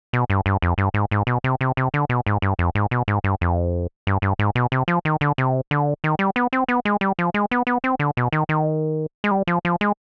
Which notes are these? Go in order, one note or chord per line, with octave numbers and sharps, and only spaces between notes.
B2
G2
G2
F2
G2
G#2
G#2
B2
C3
C3
C3
D3
B2
G#2
G2
F2
G#2
B2
G#2
G2
F2
G2
G2
G#2
B2
C3
F3
D#3
D3
C3
D3
D#3
G3
B3
C4
B3
G#3
G3
F3
G#3
B3
B3
C4
D3
B2
D#3
D#3
G#3
G3
F3
F3
G#3